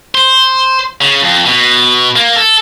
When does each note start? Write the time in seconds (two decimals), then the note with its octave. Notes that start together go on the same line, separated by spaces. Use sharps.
0.15 C5
1.01 C#3
1.22 F2
1.46 B2
2.16 A#3
2.36 A4